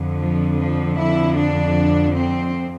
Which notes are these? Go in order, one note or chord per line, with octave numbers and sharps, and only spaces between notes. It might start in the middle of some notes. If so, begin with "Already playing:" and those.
Already playing: F2 D3
F3
F3
E4
D4
C4